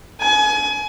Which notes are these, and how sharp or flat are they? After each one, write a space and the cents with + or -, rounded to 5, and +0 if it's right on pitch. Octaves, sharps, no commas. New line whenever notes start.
G#5 +30